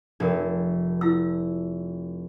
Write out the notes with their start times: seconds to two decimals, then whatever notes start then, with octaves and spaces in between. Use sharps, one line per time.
0.20 F1 D4 A#4
1.01 E4 F4 E6